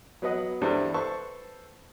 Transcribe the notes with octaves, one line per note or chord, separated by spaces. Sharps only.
F#3 B3 B4 D#5 F#5
E2 G2 G3 C4 A4
A4 B4 C5 A5 C#6